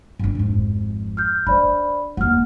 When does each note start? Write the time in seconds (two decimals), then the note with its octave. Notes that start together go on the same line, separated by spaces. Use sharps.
0.19 G2 D4
0.35 G#1 F2
1.17 F6 G6
1.47 D4 C5 D5 B5
2.17 E1 D#2 F#5 F6